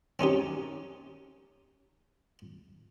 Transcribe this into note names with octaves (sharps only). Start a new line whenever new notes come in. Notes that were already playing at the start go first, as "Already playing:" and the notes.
C4 C#4 D#4 G4